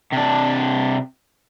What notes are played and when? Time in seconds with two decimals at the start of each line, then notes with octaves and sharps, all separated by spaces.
0.13 C3 D4